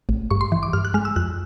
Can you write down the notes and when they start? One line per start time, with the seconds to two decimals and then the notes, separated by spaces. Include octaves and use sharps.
0.09 A1
0.31 G2 C#6
0.41 C6
0.52 E3
0.63 D6
0.73 G2 F6
0.85 F#6
0.94 G#3 F6
1.05 E6
1.16 F2 F#6